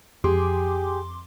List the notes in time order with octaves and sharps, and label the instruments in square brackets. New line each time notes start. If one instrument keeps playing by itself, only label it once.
[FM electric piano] F2 C6 D6 [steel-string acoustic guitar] G4 G#4